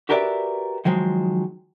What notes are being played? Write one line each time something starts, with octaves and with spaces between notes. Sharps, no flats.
F#4 G4 A#4 B4 D5 E5
D#3 F3 F#3 G#3